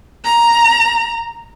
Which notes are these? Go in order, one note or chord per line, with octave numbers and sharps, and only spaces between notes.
A#5